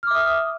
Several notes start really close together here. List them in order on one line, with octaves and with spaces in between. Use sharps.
F6 D6 E5 D#6